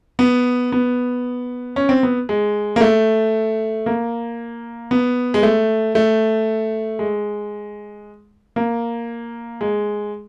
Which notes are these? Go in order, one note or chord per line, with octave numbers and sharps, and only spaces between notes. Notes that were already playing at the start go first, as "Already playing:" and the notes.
B3
B3
C#4
C4
B3
G#3
A#3
A3
A#3
B3
G#3
A3
A3
G#3
A#3
G#3